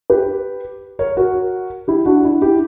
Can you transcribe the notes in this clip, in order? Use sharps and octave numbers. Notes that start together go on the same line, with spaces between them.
G4 B4
A#4 C#5
F#4 A#4
E4 G4
D4 F#4
E4
E4 G4